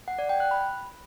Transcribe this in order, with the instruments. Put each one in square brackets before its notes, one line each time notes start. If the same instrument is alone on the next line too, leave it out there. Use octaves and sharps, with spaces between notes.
[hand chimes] F#5
D5
G5
F#6
B5